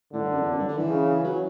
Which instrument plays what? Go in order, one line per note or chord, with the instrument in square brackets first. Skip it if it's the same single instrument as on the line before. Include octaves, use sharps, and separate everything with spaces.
[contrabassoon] A2 [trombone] D3
[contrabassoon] G2
F#2
E2
F#2
G2
D3
E3
[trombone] C#3
[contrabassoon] F#3